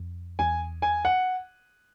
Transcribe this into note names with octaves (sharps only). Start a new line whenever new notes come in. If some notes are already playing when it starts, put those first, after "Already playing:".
Already playing: F2
E2 G#5
G#5
F#5